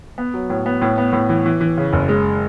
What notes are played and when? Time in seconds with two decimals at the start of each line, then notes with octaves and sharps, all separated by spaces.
0.18 B3
0.34 F#3
0.50 A2
0.66 B3
0.82 A2
0.98 B3
1.13 A2
1.29 E3
1.46 E3
1.61 E3
1.78 C#3
1.93 F#1
2.09 G#3